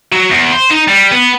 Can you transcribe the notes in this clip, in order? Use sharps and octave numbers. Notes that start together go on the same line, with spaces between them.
F#3
E2
C5
D#4
G3
B3